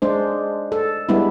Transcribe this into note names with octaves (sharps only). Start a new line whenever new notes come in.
G#3 D4 C5
A4
G3 G#3 B3 D4 E4